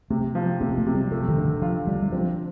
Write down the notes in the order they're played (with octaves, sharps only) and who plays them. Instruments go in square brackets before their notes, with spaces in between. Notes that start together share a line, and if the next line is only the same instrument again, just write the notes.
[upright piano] C3 [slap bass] A3
[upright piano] F3
[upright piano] C3 [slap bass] A#3
[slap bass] A3
[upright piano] C3
[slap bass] G3
[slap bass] F3 [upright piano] A3
[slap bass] D#3
[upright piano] D3
[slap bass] D#3
[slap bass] F3 [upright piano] F4
[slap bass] G3 [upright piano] D4
[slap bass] G3
[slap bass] F3 [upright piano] C4